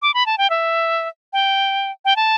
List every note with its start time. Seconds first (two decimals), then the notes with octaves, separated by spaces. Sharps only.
0.02 D6
0.14 B5
0.26 A5
0.38 G5
0.50 E5
1.33 G5
2.05 G5
2.16 A5